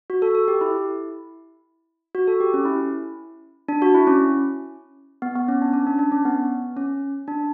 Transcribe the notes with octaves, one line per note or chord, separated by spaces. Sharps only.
F#4
A4
A4
G4
E4
F#4
A4
G4
C#4
E4
D4
F#4
E4
C#4
B3
B3
C#4
D4
C#4
D4
D4
C#4
B3
C#4
D4